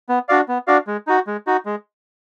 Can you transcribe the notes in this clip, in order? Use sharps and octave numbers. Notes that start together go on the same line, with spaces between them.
B3
D4 F#4 D5 F5
B3
D4 F#4 D5 F5
G#3
D#4 F#4
G#3
D#4 F#4
G#3